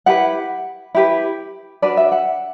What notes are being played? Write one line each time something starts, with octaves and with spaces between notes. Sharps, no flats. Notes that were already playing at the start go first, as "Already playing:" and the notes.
E4 G4 B4 F#5
E4 G4 B4
D4 F#4 B4 D5
E5
F#5